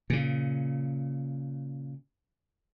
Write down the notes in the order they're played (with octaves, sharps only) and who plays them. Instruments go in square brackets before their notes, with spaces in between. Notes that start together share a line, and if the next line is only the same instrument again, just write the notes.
[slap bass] A#2 C#3